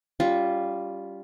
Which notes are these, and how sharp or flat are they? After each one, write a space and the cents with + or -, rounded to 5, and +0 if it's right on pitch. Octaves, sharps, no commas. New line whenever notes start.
G3 +0 C#4 +30 F4 +0